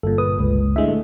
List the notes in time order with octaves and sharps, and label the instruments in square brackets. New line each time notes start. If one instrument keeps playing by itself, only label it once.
[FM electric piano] G1 A#2 [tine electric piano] A4
[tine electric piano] B4 D#6
C#2
[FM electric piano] A2 D3 G#3 [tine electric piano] E5
[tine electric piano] A3